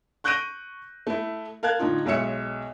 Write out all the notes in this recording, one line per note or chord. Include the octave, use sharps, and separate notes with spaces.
C#6 F#6 G6 A#6 D7 D#7
A3 E4
A#4 F5 A5 F#6 G#6
A2 D3 D#4 F4
B1 G#3 C#5 E5 C#7